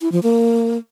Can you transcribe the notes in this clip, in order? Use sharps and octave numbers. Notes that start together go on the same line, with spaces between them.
E4
F3
A#3